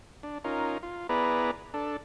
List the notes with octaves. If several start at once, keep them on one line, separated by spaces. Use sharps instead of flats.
D4
C#4 D#4 F4 A#4
F4
B3 E4 G#4 B4 D5 A#5
D4 A4